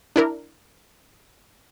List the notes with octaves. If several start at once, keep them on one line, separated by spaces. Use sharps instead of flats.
D4 E4 A#4